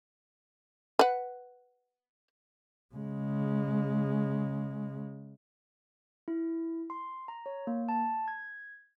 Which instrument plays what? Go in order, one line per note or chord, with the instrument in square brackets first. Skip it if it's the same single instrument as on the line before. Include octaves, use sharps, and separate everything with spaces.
[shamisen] B4 F#5
[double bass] C#3 G#3
[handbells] E4
C6
A#5
C#5
A#3
A5
G#6